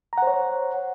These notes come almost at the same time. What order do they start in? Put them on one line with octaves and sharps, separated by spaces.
A#5 F#5 C5 C#5